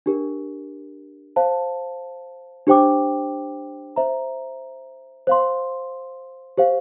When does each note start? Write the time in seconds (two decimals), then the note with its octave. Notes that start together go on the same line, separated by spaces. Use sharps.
0.06 D4 G4 A#4
1.36 C5 F5 A5
2.67 D4 G4 C5 G5 D6
3.96 C5 E5 A#5
5.27 C5 F5 C6
6.58 G4 C5 F5